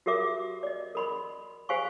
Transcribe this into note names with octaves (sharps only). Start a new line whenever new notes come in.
F#4 G4 A#4 E5 D6
D5 D#5
A#4 B5 C6
G4 C5 F5 G#5 C6 C#6